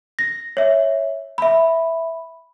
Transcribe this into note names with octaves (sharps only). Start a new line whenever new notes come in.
A#6
C#5 E5
E5 B5